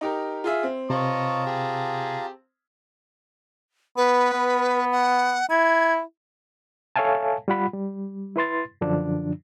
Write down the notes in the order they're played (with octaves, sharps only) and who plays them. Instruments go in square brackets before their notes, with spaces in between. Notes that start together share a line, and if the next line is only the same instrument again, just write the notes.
[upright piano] D#4 G4 A#4
F4 G#4 E5
C4
[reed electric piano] C3 [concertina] F4 A5 A#5 [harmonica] C#5 D#5 C#6
[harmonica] G4 G#4
[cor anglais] B3 [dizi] B4
[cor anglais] B3
[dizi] F#5
[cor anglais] E4 [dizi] G#6
[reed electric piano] A4 C#5 E5 F5 G#5 A5
G3 F4 F#5 B5
G3
E4 B4 C6 A6
F#2 D3 F3 D4